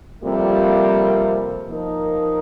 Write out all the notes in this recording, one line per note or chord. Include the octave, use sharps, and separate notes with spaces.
F2 C3 G3 A#3 F4
F3 A#3 D#4 A#4